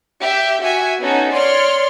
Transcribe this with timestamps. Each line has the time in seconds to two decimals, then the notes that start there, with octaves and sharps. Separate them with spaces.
0.20 G4 E5
0.63 F#4 E5 G#5
1.00 B3 C#4 D#4 F#4 A4
1.31 C#5 D5 C6 F6